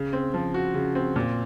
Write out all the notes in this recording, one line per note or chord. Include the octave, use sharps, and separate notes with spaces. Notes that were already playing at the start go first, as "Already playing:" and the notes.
Already playing: C#3
C4
F3
F#4
C#3
C4
A#2